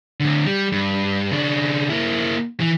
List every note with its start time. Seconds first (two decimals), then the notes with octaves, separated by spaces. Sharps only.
0.20 A2 D3
0.46 G3
0.72 G2
1.31 C#3 D4
1.90 A#3 E4
2.60 E3